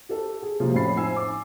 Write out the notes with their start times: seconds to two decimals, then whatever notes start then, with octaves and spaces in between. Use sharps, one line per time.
0.09 G4 A4
0.42 G#4
0.60 C3 F3 F#3 G#3 A#3 C4
0.74 F2 A2 C#4 B5 A6 C7
0.97 F3 C4 D#4 G#5 E6 C7
1.16 D6